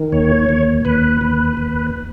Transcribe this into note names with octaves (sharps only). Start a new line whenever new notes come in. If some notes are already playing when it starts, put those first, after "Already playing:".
Already playing: D#3
D#2 C#5
D#2
D#2 B4
D#2
D#2